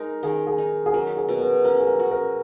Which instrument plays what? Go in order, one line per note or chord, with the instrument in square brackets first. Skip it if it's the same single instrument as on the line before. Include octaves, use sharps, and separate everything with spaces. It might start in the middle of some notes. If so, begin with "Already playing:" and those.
Already playing: [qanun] G#3 D#4 [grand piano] A#4
[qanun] D#3 [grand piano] G#4
[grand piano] G#4
[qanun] D#4
[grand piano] G#4
[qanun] F#3 [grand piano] A#4
[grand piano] G#4
[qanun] B2
[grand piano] A#4
[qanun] C#4 [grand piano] A#4
[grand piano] G#4
A#4
[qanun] F#4
[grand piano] A#4